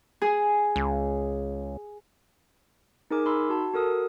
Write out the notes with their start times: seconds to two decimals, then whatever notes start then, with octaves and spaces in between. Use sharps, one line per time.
0.22 G#4
0.76 C#2
3.11 D#4 G#4 A#4 G#5 D6
3.25 D#4 B5 C6 E6
3.49 F#4 A5
3.74 F#4 A4 A#4 D#6